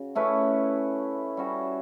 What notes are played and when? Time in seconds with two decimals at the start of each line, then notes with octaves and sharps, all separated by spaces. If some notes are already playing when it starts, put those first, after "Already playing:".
Already playing: C#3 F#4
0.15 A3 C#4 E4 B4
1.37 G3 C#4 F#4